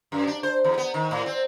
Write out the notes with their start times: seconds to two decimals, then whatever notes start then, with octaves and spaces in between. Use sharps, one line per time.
0.12 F#2
0.27 D4
0.43 C5
0.64 E2
0.78 B3
0.94 D#3
1.11 A2
1.26 C4